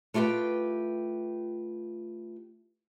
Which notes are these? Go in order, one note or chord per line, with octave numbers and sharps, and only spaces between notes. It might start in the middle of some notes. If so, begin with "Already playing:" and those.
A3 F4 G4 B4 G5